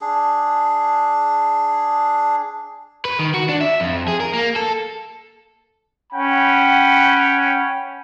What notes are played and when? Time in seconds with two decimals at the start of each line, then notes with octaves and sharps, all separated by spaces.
0.01 D4 G#4
3.05 B4
3.19 D#3
3.34 F#4
3.49 D4
3.61 E5
3.80 F2
4.08 G#4
4.20 A#4
4.33 A#3
4.56 A4
6.13 C#4 F#5 G5 B5